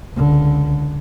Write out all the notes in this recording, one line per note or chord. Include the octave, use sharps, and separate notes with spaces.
C#2 D3